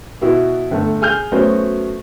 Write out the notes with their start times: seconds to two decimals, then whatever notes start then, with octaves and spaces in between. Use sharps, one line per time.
0.21 B2 E4 F#4
0.71 G1 A3 A4
1.01 G#4 G#5 F6 G6
1.32 F#3 A3 B3 C#4 F#4 C5